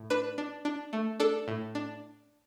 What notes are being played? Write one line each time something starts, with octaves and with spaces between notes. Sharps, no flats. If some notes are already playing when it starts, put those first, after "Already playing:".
Already playing: A2
D4 B4
D4
D4
A3
D4 A4
A2
D4